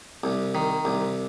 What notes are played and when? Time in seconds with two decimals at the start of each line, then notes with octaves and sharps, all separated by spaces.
0.24 C2
0.55 D#3
0.85 C2